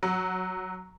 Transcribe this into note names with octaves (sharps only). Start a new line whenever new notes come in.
F#3